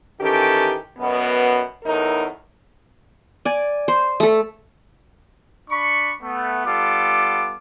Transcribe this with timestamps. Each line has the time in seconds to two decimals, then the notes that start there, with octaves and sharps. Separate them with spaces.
0.20 D#3 E3 C#4 G4 A4
0.97 F#2 B2 B3
1.84 E2 A2 D#4 A#4
3.45 D5 G#5
3.88 C5
4.20 A3 A4
5.70 D4 B5 C#6
6.22 A3 B3
6.66 G3 B3 F4 A4 D6